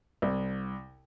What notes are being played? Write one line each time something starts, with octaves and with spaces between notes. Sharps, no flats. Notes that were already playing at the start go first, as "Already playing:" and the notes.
C2